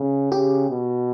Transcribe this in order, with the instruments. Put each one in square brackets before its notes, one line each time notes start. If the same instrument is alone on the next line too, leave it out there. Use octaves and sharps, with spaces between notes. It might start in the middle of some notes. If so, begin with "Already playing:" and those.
Already playing: [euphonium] C#3
[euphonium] C#3 [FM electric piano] G4
[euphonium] B2